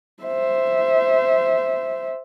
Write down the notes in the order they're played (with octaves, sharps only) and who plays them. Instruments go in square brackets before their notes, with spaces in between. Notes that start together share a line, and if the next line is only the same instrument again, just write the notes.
[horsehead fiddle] C5 E5